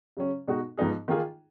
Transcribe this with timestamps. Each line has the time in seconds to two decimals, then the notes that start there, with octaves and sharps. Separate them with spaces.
0.17 C#3 F#3 C#4
0.48 B2 G#3 D#4 F#4
0.77 G#2 F3 B3 D#4 G#4
1.08 D#3 A#3 F4 G#4